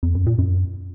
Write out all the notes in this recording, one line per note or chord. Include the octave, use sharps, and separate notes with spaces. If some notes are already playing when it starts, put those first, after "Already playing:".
F2
F#2
A#2
F#2